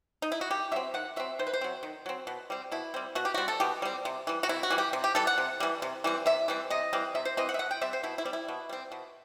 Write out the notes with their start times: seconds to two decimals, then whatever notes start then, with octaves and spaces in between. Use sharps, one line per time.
0.22 D#4
0.32 E4
0.41 F#4
0.50 D#3 G4
0.72 F#3 C4 E5
0.94 D#3 F#5
1.16 F#3 C4 E5
1.39 D#3 C5
1.47 B4
1.53 C5
1.61 F#3 C4
1.83 D#3
2.06 F#3 C4
2.27 B2
2.50 G3 C4
2.72 B2 E4
2.94 G3 C4
3.15 B2 F#4
3.25 G4
3.34 G3 C4 F#4
3.48 A4
3.60 B2 G4
3.82 G3 C4
4.05 C3
4.27 E3 G3
4.43 F#4
4.49 C3 E4
4.63 F#4
4.70 E3 G3
4.78 G4
4.93 C3
5.04 G4
5.15 E3 G3 A4
5.27 F#5
5.38 C3
5.60 E3 G3
5.82 C3
6.04 E3 G3 C4
6.26 C3 E5
6.48 E3 G3 C4
6.70 C3 D#5
6.93 E3 G3 C4
7.15 C3 E5
7.25 C5
7.37 E3 G3 C4 D#5
7.49 F#5
7.54 E5
7.59 B2 F#5
7.71 G5
7.81 G3 C4 E5
7.93 C5
8.03 B2 E4
8.18 E4
8.25 G3 C4
8.33 E4
8.48 B2
8.69 G3 C4
8.92 B2